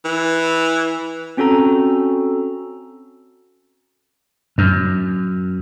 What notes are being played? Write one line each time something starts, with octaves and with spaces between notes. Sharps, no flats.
E3
C4 C#4 F#4 A4 A#5
F#2